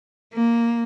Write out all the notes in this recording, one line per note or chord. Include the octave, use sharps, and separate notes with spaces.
A#3